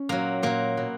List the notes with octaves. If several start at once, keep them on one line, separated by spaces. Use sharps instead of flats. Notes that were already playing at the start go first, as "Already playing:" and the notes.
Already playing: C#4
A#2 F#3 A#3
A#2 F#3 A#3
B2 F#3